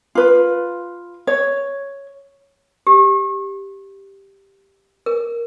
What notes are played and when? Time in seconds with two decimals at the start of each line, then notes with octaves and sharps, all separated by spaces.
0.15 F4 B4
1.27 C#5
2.87 G4
5.06 A#4